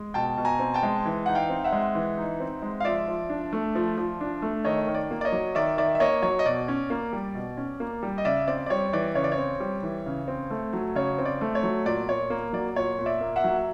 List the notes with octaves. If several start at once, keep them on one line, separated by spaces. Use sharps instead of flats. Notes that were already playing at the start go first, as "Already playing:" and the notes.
Already playing: G#3
B2 G5 A5
B2
G#5 A#5
C4
G5 A5
G#3
E3
D#4 F#5
F5 G5
C4
E5 F#5
G#3
E3
D#4
C4
G#3
F5
F3 D5 E5
F3
D4
A3
F3
F3
D4
A3
D#3 C#5 D#5
D#3
D5
A#3
D5
C#5 D#5
F#3
D#3 D5 E5
D#3 D5 E5
E5
A#3 C#5 D#5
F#3 C#5
D#5
B2 D5
C#4
A#3
G3
B2
C#4
A#3
G3
D#5
C#3 D5 E5
C4 D5
D5
G3 C#5
E3 D5
C#3 C#5
D5
C#5
C4
G3
E3
C#3
C4
A3
F#3
C#3 C#5
C4
D5
A3
C#5
F#3
A#2 D5
A#2 C#5
A#3
F#3 D5
A#2 C#5
A#2
D5 E5
A#3
E5 F#5
F#3